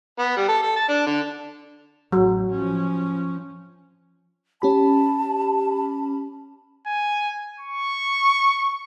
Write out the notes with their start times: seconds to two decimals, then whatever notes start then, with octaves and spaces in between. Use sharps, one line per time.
0.19 B3
0.36 G3
0.48 A4
0.62 A4
0.76 A5
0.89 D4
1.06 D3
2.12 A1 F#3
2.51 F3 C#4
4.62 C#4 G4 A5 B5
6.87 G#5
7.60 C#6